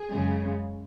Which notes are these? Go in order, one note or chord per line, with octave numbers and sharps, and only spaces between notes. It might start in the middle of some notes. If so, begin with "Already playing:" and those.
Already playing: G#4
F#2 C#3 G#3